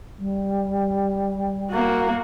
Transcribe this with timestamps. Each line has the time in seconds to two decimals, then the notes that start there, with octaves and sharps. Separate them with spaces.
0.18 G3
1.71 A#3 F#4